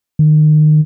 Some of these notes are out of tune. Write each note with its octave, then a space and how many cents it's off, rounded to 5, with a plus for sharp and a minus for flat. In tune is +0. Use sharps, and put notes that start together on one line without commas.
D#3 -30